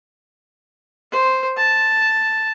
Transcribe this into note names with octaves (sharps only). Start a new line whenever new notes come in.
C5
A5